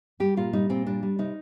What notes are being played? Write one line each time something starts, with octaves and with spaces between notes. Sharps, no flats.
G3 G4
A#2 F4
G3 D#4
A#2 C4
G3 D4
G3
C3 D#4